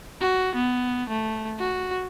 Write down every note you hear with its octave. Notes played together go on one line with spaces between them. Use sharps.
F#4
B3
A3
F#4